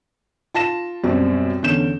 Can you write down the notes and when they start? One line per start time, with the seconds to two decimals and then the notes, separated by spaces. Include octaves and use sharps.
0.54 F4 A5 A#6 E7
1.04 F#2 B2 G3 C4
1.63 E2 D3 C#4 G6 E7